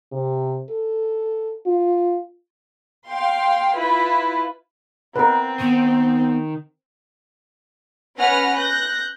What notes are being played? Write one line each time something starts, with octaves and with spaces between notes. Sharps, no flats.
C3
A4
F4
F5 G5 C6
E4 F4 B4
C4 A#4 B4
D#3 B3
C#4 B4 F#5 F6 A#6
F#6 G6 A#6